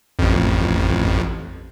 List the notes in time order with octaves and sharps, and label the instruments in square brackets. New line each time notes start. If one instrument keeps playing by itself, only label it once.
[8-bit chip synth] A1 F2